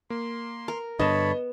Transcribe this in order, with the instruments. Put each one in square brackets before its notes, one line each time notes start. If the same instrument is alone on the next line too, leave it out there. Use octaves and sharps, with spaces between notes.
[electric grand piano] A#3 [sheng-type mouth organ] C6
[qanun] A#4
[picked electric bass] G2 D3 [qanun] B3 [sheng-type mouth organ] C#5 A5 B5 [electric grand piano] D#5 E7